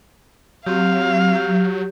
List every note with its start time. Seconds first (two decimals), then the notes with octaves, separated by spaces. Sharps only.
0.66 F#3 C4 G4 F5
1.36 G4